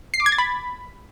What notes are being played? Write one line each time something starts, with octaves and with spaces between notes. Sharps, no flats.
C7
D6
G#6
A6
B5